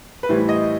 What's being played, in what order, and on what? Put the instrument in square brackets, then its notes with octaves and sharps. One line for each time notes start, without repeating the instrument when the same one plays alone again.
[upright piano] B4
A2 E3 G3 C5
D#5